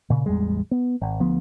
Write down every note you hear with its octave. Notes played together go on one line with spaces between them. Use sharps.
A#2 C#3
A1 E2 G3 G#3
B3
G#1
D2 F3 B3